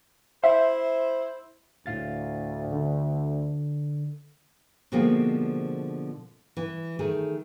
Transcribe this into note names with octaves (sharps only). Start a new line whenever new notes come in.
E4 C5 E5
D2 A2 F5 A6
D3
B2 D3 F3 G#3 A#3 C4
E3
D#3 A3 G#4